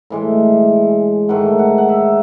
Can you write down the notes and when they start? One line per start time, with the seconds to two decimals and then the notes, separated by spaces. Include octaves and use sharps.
0.10 A2 E3 G#3
1.29 G#2 D#3 A3 F#5
1.59 F#5
1.78 F#5
1.89 E5